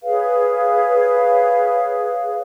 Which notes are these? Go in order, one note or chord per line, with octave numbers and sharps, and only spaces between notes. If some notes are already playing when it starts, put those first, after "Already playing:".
G#4 B4 C#5 F5